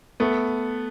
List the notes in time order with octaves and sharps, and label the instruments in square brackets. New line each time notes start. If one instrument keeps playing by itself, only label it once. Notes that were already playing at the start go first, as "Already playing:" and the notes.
[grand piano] A3 B3